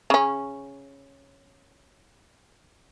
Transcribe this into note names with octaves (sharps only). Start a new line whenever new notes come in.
C#3 C#4